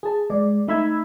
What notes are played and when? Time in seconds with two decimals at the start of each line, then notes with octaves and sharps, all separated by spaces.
0.03 G#4 A5
0.30 G#3 D5
0.68 A3 D#4 E5 B5 E6 G#6